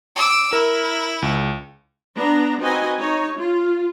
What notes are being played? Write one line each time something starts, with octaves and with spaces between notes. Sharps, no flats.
D6 E6
E4 A#4
C#2
B3 D4 A#5
C4 D#4 F#4 B4 D#5 G#5
D#4 C#5
F4